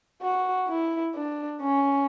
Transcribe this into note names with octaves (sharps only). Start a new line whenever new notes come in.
F#4
E4
D4
C#4